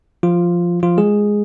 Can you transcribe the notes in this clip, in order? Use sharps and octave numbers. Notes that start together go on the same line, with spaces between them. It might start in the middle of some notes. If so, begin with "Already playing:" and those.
F3 F4
F3 F4
G#3 G#4